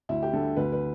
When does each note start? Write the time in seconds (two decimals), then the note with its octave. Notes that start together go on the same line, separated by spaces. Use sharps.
0.09 D2 E4
0.22 G4
0.33 D3 G3 A4
0.57 D2 B4
0.72 B4